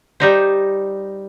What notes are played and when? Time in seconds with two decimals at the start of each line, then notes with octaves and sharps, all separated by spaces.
0.20 G3 D#4 C5